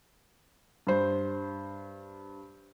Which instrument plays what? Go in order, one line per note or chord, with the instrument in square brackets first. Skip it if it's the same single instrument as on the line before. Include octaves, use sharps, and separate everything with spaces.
[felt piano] G2 C5